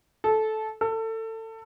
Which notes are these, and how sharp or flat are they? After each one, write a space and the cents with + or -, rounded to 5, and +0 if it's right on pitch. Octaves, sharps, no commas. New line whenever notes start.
A4 -15
A4 +25